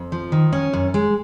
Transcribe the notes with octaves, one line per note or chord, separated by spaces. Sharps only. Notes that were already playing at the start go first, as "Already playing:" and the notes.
Already playing: F2
F3
D#3
C#4
F#2
G#3